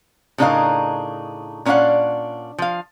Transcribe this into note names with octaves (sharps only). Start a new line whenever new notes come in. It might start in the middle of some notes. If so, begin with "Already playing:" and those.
A2 C#3 D4 D#4 A#4 F5
A#2 C#4 D4 D5 F5 F#5
F3 F5